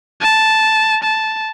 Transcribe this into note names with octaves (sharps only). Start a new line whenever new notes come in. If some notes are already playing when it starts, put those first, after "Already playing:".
A5
A5